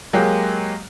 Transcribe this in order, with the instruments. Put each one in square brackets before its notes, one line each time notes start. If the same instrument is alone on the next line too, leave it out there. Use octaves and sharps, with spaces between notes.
[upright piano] F#3 G#3 A#3 G4